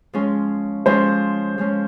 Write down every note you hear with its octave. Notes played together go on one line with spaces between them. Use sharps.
F3 G#3 C#4
F3 G#3 C#4 C5
F3 G#3 C#4